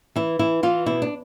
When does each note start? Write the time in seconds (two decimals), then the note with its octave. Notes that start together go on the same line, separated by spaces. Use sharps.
0.16 E3 E4
0.39 E3 E4
0.63 E3 F4
0.86 B2 E4
1.02 D4